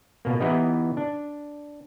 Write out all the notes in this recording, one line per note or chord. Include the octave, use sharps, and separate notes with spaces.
B2 A#3
E3 B3 D#4 E4 G4 D#5
D4